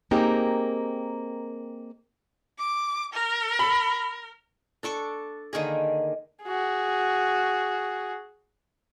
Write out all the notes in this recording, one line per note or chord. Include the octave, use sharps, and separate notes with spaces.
A#3 C4 D#4 G4 G#4 A#4
D6
A#4
B5
D4 A4 C#6 D6
D3 D#3 A#3 G#4
F#4 G#4